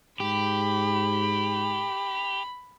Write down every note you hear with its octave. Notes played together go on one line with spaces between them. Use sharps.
G#2 G4 B5